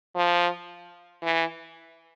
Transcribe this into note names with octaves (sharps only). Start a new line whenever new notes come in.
F3
E3